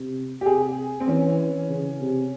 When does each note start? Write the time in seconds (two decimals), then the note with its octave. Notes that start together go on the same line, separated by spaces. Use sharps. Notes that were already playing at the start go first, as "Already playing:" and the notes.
Already playing: C3
0.41 G4
0.46 C3 G#4
1.00 C4
1.08 E3 C#4
1.69 C#3
2.01 C3